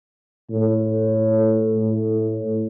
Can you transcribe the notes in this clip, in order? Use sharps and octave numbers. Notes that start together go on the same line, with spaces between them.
A2
A2